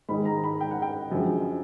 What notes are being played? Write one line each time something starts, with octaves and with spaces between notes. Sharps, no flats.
G#2 D#3 G#3 B5
A#5
B5
G5
F#5
G5
F#2 D3 F3 G#3